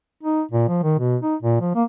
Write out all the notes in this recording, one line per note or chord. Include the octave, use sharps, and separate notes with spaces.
D#4
A#2
F3
D#3
B2
D#4
A#2
F3
A#3